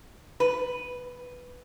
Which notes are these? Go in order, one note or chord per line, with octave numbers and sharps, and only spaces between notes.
B4